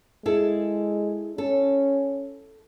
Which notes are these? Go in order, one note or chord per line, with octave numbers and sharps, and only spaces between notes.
G#3 E4 G#4 A4
C#4 A4